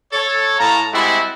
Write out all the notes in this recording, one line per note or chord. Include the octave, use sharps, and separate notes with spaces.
A4 C#5
A2 F5 A5 A#5
G3 G#3 C4 E4 F#4 E5